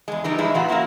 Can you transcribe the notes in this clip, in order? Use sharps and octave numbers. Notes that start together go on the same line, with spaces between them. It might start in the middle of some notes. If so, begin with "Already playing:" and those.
E2 G#3
E3 G3 D#4
E3 F3 G#3 E4
A#2 E3 B3 F4 F#4
A#3 C#4 E4 F#4